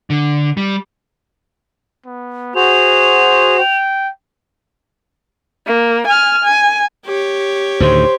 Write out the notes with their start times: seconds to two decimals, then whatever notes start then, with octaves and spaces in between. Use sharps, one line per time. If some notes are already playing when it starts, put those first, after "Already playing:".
0.10 D3
0.57 G3
2.06 B3
2.56 F#4 G#4 C5 F7
3.59 G5
5.67 A#3
6.07 G#5 F6
6.44 G#5
7.06 G4 C#5
7.80 D2 A2 D#3 C5